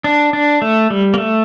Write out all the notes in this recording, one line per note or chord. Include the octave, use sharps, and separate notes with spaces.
D4
D4
A3
G3
A#3
A3